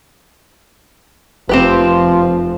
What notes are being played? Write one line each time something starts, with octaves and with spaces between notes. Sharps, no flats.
F1 F3 C4 G4 B4